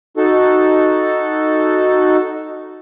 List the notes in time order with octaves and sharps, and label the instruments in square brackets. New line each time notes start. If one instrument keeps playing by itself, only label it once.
[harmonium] D#4 F#4 A4